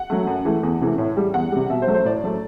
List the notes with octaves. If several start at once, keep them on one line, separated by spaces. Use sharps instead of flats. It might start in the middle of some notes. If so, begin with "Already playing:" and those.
Already playing: F#5
F#3 A3
F#2
E3 A3
E2
C3 E3 A3
A2
G3
E2 F#5
C3 G3
B2 E5
C5
F#3 A3
C5
A2 D5
F#3 A3